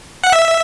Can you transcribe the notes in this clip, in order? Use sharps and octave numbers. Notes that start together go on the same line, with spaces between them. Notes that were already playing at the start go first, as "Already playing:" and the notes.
F#5
E5